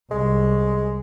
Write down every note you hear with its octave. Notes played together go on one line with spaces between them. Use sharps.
C2 G#3